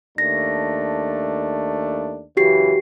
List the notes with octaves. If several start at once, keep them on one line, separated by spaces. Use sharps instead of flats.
D#2 A3 D4 A#6
F#2 C#3 E3 F#4 G4 C7